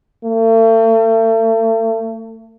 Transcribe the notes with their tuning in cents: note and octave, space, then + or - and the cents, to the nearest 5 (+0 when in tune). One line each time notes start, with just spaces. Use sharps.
A3 +40